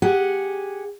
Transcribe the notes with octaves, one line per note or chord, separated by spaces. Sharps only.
G4 G#4 F#5